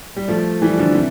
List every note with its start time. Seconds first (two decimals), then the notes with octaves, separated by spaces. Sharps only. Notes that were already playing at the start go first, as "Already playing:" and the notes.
0.16 G3
0.28 F3 A3
0.62 E3 G3
0.78 D3 F3
0.94 C3 E3